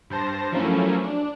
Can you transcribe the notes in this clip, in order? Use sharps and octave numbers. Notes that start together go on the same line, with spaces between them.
G2 C5 A5 A#6
F3 F#3 A3 A#3 C#4 E4
D4